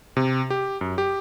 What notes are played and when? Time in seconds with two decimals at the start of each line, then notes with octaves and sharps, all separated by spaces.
0.17 C3
0.50 G4
0.81 F#2
0.98 G4